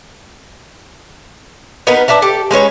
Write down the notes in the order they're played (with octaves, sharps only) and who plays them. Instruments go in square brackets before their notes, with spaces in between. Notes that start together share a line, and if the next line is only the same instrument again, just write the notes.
[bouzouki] B3 D#4 A#4 B4
D4 B4 E5 A#5
G4 A4
G#3 C#4 B4 C#5